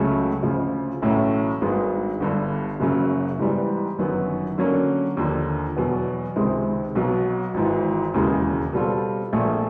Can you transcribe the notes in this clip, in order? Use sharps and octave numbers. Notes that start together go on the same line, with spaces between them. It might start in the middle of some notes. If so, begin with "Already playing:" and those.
Already playing: C#2 C#3 F#3 A3
D2 C#3 F3
B1 A2 E3 A3 C#4
G#1 G2 D#3 G#3 B3
G1 G2 D3
F#1 F#2 C#3 F#3
G#2 E3 G3 B3
G1 F#2 D#3 F#3 B3
D3 F#3 A#3 C#4
D#2 D3 F3
E2 B2 F#3
C#2 C3 D#3 G#3 C4
B1 B2 F#3
G#1 G#2 E3
E1 D#2 C#3 E3 G#3
B2 G3 C4 F4 A4
A#1 A#2 F3 A3